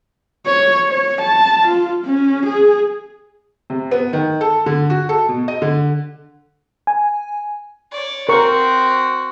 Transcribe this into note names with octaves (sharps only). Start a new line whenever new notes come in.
C#5
C#5
A5
F4
C#4
G#4
C3
B3
D#3
A4
D3
F#4
A4
B2
D#5
D3
G#5
C#5 D5
C4 F#4 A#4 C#6